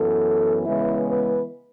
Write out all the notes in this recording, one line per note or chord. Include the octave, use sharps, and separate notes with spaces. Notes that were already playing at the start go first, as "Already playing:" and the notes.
Already playing: F#2 E3 B3 A4
C#3 E3 G#3 B3 E4
B4